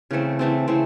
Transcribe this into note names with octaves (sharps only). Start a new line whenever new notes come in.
C#3 E3 A3 C4
C#3 E3 A3 C4
C#3 E3 A3 C4